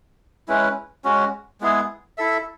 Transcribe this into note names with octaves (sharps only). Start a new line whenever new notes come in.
G#3 C#4 E4 B4
G#3 C#4 F#4
G#3 B3 E4 G#4
E4 A4 E5